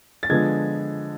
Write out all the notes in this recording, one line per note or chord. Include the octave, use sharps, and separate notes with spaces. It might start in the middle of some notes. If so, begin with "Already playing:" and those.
A6
D3 F3 G#3 B3 D4 G#6